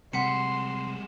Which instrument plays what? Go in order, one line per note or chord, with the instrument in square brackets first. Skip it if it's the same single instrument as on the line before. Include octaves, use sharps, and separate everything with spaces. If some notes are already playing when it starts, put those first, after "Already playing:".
[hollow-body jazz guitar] C3 [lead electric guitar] G3 G#3 [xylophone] F#5 B6 C#7 [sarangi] C6